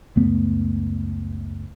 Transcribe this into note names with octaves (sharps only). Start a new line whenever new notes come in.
C#2 F#2 A3 B3